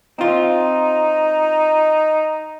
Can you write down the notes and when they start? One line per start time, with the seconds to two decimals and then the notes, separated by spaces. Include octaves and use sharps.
0.19 C4 D#4 F4